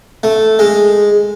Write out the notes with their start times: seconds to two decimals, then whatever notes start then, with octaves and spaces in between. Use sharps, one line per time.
0.23 A3
0.59 G#3